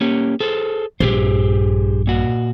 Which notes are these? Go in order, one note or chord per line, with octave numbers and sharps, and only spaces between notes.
A#3 C#4 G4
G#4 A4 C5
A#1 G2 G4 G#4 C5
A#2 F#4